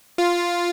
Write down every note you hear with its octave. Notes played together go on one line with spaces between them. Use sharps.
F4